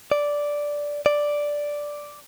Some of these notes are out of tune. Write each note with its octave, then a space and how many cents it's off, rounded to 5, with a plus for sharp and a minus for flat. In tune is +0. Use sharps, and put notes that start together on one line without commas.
D5 -5
D5 +0